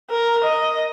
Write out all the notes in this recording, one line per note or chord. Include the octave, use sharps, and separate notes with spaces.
A#4
D#5